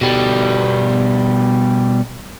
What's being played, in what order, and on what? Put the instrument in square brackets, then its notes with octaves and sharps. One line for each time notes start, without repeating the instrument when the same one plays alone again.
[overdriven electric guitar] B2 G3